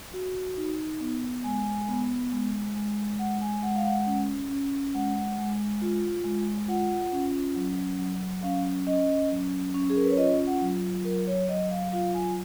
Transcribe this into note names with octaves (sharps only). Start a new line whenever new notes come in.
F#4
D#4
B3
G#3 G#5
B3
G#3
G#3
G#3 F#5
G#5
G#3 F#5
F5
F#5
C#4
C#4
G#3 F#5
G#3
F4
G#3
F4 F#5
C#4
F#3
F#3
C#4 F5
C#4 D#5
F#3
C#4
G#4
A#4
B4
C#5
F4 D#5
F#5
F#3
F#3 A#4
C#5
F#3 D#5
F5
F4 F5
G#5